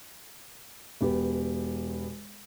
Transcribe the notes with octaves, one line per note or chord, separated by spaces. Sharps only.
E1 B3 G4